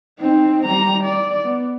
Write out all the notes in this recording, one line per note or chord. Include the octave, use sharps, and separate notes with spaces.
C4 D#4
G3 A#5
D5
B3